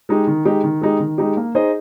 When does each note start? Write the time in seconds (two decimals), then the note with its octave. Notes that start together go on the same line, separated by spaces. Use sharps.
0.09 G#3 D#4 G4
0.27 D#3
0.45 G#3 D#4 G4
0.64 D#3
0.81 G#3 D#4 G4
1.00 D#3
1.18 G#3 D#4 G4
1.37 A#3
1.55 D#4 G#4 C5 D#5